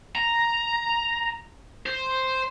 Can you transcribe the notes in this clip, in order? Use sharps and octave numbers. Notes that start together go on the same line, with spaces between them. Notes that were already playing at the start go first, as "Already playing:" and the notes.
A#5
C5